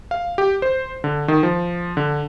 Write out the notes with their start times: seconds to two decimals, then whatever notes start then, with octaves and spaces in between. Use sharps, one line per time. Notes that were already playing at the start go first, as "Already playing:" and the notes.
0.11 F5
0.38 G4
0.62 C5
1.04 D3
1.28 D#3
1.43 F3
1.97 D3